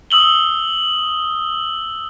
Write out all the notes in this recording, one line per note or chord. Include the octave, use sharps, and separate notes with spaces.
D#6 E6 F#7 G7